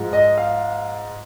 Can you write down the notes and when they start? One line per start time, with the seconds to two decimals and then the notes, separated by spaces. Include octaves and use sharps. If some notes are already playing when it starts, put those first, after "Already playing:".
Already playing: G#2 F3 G#3
0.13 D#5
0.38 F5